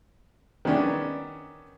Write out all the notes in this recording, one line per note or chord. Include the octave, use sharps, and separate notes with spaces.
D#3 B3 C#4 D4